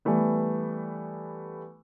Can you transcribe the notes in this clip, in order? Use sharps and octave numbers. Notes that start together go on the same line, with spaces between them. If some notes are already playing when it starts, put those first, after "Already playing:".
E3 G3 A3 B3